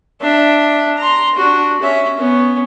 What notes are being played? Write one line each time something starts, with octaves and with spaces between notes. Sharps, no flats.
D4 E5
A#5 C6
D4 F#4
C#4 E5
B3 C#4